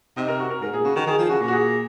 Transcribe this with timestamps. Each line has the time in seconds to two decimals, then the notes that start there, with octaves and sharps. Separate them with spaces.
0.17 C3 D#4
0.28 A#4
0.40 F#4
0.50 A#4
0.62 G#2 A#4
0.73 A#2 G#4
0.84 C#3 F#4
0.96 D#3 F#4
1.07 D#3 G#4
1.19 F3
1.29 C#3 F#4
1.41 A#2
1.48 F#4
1.52 G#4